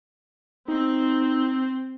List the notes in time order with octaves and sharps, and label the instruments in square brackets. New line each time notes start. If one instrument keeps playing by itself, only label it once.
[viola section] C4 [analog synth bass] D#4